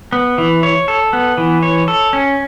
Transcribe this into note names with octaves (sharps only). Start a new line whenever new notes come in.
B3
E3
C#5
A4
B3
E3
C#5
A4
C#4